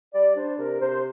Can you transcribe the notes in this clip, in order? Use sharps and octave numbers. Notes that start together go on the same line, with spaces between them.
G3 D5
D4 C5
C3 A#4
C3 C5